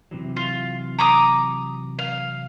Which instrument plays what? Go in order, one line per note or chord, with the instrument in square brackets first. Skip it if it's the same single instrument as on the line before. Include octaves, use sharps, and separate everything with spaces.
[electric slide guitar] C3 E3 F#3
[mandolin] F4
A#5 D6 D#6
F5